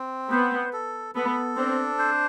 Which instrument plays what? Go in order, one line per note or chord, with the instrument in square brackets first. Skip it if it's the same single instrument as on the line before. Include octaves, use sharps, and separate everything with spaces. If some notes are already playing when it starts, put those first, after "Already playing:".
Already playing: [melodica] C4
[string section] B3 [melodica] C5
[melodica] A4
[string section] B3 [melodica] A4
[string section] C4 [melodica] D4
[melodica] C5